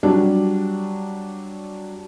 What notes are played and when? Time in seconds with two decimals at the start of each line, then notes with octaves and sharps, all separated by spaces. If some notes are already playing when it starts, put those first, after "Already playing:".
0.03 F#3 G3 D4